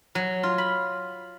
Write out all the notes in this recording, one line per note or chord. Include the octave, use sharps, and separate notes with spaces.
F#3
F4
B5